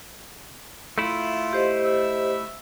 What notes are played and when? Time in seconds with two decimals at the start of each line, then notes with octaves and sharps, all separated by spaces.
0.98 A3 E4 F4
1.53 G4 C5 D#5
1.85 E5